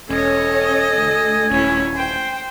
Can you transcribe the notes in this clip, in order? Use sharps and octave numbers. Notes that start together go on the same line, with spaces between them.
E1 C#4 A4 C#5 D#5 G#5
D2
D#1 C#4 E4
C5 G5